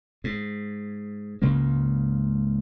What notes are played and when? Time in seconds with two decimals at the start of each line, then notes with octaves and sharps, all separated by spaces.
0.24 G#2
1.42 C#2 G#2 C#3 A#3